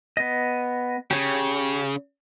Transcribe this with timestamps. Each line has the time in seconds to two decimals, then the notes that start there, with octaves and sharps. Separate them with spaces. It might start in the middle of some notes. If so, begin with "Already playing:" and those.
0.17 B3 D#5
1.11 C#3 G4 C#5